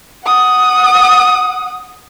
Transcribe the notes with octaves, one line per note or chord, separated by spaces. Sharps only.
F#5 D#6